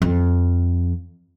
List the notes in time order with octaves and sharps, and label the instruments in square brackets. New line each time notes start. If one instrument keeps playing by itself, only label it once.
[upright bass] F2